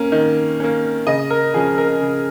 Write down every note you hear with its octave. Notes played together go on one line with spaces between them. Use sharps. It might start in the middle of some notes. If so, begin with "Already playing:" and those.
Already playing: A#3 C#4
D#3
A#3 C#4
C#3 D#5
A#4
F3 C#4 G#4
A#4
C#3